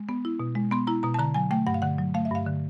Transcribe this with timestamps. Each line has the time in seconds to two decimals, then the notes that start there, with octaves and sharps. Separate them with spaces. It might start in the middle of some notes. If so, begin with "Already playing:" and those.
Already playing: G#3
0.09 B3
0.25 E4
0.40 B2
0.55 G#3
0.71 B3 C6
0.87 E4 A#5
1.03 B2 A#5
1.14 A5
1.19 D3 A#5
1.34 F#3 G#5
1.51 A3 G5
1.67 G2 F#5
1.74 F5
1.82 D3 F#5
1.98 F#3
2.14 A3 F5
2.25 E5
2.31 G2 F5
2.46 D3